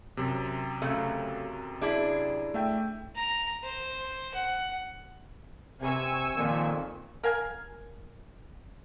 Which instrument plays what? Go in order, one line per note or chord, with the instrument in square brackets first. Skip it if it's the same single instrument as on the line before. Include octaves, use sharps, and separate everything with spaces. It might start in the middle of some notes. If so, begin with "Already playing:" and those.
[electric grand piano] F#2 C3
[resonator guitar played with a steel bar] C#3 F#3 A3
D4 E4 G#4
[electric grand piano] A3 E5 G5
[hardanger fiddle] A#5
C5
F#5
[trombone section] C3 [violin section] G#5 C#6 E6
[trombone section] F2 A#2 D#3
[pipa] A#4 F5 G#5